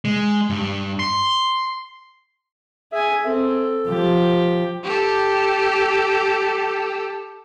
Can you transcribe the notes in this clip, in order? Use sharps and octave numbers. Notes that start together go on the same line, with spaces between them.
G#3
G2
C6
G#4 E5 G#5
C4 A4
F3 G4
G4 A4